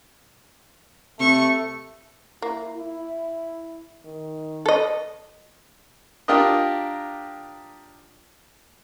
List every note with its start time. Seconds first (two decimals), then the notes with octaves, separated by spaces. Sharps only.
1.20 C3 A3 C#6
2.42 A#3 E4
2.76 E4
4.05 D#3
4.66 A4 D#5
6.28 D4 F4 G4 A#4 D#5